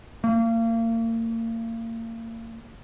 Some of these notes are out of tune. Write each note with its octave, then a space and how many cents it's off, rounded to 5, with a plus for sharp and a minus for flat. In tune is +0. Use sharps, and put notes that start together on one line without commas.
A#3 -35